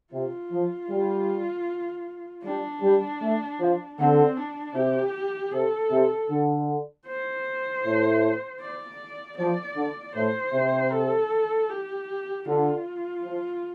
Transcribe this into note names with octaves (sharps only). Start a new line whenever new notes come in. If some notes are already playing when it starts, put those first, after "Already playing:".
C3 F4
F3
G3
G3 D4
G3
A3
F3
D3 C4
D4
C3 G4
C3 A4
C3
D3
C5
A2
D5
F3 D5
D3
A2 C5
C3
A4
G4
D3 F4
F3